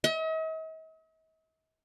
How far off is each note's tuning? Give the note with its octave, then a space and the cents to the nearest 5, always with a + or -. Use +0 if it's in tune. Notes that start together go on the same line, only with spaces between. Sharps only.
D#5 +45